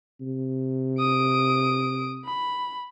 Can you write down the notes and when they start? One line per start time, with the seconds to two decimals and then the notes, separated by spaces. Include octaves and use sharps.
0.21 C3
0.99 D#6 D7
2.25 B5